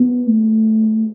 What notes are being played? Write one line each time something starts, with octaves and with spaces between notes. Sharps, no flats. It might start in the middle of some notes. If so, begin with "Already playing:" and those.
Already playing: B3
A3